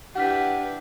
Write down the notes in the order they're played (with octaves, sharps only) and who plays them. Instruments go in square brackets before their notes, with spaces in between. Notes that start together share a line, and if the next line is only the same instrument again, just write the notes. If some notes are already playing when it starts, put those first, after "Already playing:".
[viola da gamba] D4 E4 B4 [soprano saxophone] G4 [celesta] F#5 F6 B6